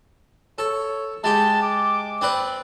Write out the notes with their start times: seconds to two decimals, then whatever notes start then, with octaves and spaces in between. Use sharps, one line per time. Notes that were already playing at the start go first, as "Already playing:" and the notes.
0.58 A4 C#5
1.24 G#3 G4 A5
1.62 D6
2.21 C4 B4 D5